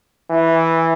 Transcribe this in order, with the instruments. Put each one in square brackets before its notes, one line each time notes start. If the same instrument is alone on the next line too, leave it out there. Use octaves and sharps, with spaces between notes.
[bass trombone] E3